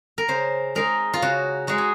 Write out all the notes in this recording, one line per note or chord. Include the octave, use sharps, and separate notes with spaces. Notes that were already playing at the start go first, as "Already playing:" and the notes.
A#4
C#3 C5
G#3 D#4 A#4
F4
C#3 F#4
G#3 D#4 F#4
G#4